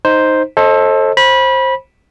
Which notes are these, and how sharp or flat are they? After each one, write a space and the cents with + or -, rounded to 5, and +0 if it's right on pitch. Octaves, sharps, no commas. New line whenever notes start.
D#4 +0 C5 +0
A4 +0 C5 +35 D#5 +5
C5 +20 B5 -20